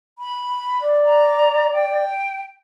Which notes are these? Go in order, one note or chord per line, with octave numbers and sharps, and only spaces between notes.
B5
D5
A#5
G5